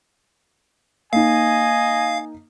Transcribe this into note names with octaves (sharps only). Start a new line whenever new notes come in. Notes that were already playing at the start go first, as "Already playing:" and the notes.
A#3 D#4 D#5 F5 G#5